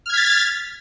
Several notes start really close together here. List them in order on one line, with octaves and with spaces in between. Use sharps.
F6 G#6 B6 A6